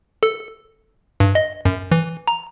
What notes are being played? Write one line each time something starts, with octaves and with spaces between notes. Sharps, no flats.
A4
G2
D#5
F#2
E3
A#5